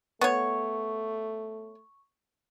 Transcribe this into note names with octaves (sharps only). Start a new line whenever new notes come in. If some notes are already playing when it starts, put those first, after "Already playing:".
A3 B3 C#5 C#6